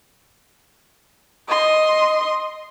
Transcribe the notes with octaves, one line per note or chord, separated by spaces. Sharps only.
D#5 C6